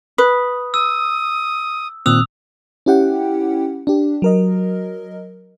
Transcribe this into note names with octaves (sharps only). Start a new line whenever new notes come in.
B4 D#6
D#6 E6
A#2 D#3 C4 D#6 E6 F#6 F7
C#4 E4 G4 F#5 G5
D4 G4
F#3 A#4 D#5